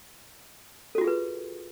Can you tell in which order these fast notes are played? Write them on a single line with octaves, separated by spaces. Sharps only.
A4 F#4 F4 G#4 B4